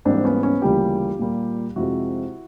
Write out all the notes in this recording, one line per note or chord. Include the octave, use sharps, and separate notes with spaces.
G#2 E3 G3 A#3 C4 D4
B3 C#4
B3 C#4
D2 C#3 E3 G3 A#3 F4 G4
A#2 G3 A#3
F2 C3 F3 G#3 E4 F#4